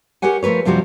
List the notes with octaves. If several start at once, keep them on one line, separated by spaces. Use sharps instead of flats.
G4 A#4 C#5 F#5 G#5
F3 A3 A#4 B4 C#5
F#2 C3 F3 G3 F#4